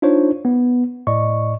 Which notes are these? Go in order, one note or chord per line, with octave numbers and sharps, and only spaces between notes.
D4 D#4 F4 C5 C#5
B3
A2 D5 D#5 C#6